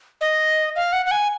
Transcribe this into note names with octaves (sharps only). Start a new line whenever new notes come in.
D#5
F5
F#5
F#5
G#5